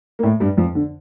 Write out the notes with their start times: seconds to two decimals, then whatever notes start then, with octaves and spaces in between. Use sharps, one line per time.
0.19 A#3
0.23 A2 A3
0.40 G2 G3
0.57 F2 F3
0.75 D3